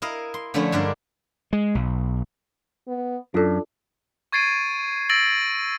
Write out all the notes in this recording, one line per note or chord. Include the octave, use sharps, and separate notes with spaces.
E4 A#4 D#5 F5
C6
D3 F3 A3 C#4 D4 E4
G2 D3 G#3 D4 A#4 D5
G#3
B1
B3
F#2 D4 F4 A4
C#6 G#6 A6 C7 D7 D#7
E6 A6 A#6 D7 F#7